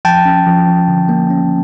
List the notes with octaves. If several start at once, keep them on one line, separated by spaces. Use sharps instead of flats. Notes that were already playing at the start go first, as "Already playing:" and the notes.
F3 G5 A5
C#4
F3
F3
D3
A#3
C#4